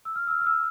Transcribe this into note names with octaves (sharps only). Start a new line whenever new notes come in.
E6
F6
E6
F6
F6
E6